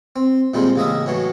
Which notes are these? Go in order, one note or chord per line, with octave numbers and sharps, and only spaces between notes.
C4
A#2 D#3 G3 G#3 C4
A1 C#3 A#3 D#5 E5
A2 E3 F#3 A3